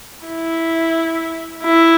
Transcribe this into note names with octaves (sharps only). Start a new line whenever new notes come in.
E4
E4